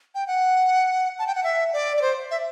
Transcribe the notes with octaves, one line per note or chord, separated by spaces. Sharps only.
G5
F#5
A5
G5
F#5
E5
D5
D5
C5
E5